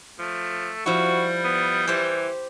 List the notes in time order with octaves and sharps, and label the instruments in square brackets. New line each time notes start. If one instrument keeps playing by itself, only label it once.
[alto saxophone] F3 [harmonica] A3
[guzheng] F3 E4 [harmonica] G3 [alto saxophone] F#4
[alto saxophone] B3
[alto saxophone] E3 [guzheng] G4 C5